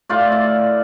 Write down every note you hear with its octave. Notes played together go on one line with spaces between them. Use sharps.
A2 F4 D5
D5